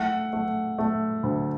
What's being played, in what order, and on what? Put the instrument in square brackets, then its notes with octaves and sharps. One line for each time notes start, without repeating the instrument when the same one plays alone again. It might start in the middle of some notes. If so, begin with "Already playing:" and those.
Already playing: [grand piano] A3 F#5
A3
A3
D2